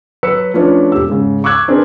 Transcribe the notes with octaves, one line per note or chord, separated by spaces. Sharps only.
F#3 F#4 B4 E6 C#7
F3 A3 C#4 D4 A4 B4
E1 G4 E6
G#2 C#3
C#6 D6 E6 F#6 G#6
C4 D4 G#4 A#4 B4